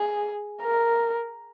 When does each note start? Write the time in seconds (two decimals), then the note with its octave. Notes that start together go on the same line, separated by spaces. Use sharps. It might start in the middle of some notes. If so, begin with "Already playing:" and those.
Already playing: G#4
0.62 A#4